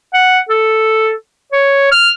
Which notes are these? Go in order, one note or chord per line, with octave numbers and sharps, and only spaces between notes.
F#5
A4
C#5
F6